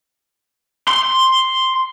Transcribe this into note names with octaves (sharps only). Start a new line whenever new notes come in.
C6